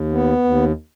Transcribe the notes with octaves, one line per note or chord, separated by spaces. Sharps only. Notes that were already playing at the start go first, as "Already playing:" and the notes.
Already playing: D#2
B3
D#2